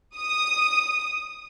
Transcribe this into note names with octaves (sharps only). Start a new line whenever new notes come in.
D#6